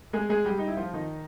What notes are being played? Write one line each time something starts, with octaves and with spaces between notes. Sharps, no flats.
G#3 G#4
G#3 G#4
G3 G4
D#4
E4
F3 F4
D#3 D#4